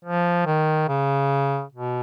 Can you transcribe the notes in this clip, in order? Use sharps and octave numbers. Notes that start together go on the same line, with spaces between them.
F3
D#3
C#3
B2